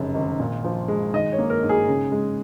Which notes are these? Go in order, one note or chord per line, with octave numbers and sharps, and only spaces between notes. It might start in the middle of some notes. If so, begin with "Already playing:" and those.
Already playing: F1 F#2 C#3
G#1
A#2
F3
G#3
D#3 D#5
C#5
A#3
A#4
G#2
G#4
C#3
G#3